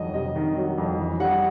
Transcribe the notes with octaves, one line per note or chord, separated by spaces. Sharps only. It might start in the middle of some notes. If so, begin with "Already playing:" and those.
Already playing: F2 D#3 F#3 D#5
C3 D#5
D#3
F#3
F2
E3
G3 F#5